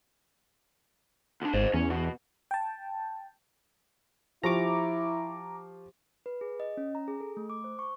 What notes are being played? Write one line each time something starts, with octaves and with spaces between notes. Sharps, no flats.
D2 D4
G#1 C5 D#5
E2 C#4
B2
G5 A5
F3 E4 G4 A#5 C#6 D6
B4
G#4
D#5
C#4
A#5
G#4
A4
A3
D6
C5
C#6